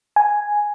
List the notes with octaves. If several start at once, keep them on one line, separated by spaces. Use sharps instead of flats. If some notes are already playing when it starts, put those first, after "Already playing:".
G#5